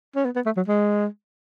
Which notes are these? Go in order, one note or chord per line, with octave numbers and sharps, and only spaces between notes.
C#4
B3
B3
A3
F#3
G#3